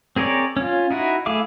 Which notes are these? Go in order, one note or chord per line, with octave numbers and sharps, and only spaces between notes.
C4 G#4 A#4 C#5 D5
C#4 F4
D#4 E4 F#4
A3 E4 G#4 F5 D6